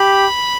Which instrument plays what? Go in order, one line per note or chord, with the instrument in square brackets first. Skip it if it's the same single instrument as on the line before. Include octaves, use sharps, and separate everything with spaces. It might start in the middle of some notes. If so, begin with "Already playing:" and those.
Already playing: [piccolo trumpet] G4 [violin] B5